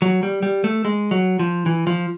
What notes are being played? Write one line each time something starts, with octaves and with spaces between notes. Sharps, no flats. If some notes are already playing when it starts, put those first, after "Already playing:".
F#3
G3
G3
A3
G#3
F#3
F3
E3
F3